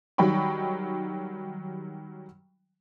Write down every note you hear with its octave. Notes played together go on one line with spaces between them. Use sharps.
D#3 F#3 G3 G5 B5 C#6